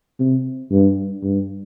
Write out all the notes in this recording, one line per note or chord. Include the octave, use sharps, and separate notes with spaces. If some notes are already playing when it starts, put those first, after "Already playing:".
C3
G2
G2